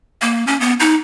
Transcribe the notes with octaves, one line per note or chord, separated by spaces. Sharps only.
A#3
C#4
B3
D#4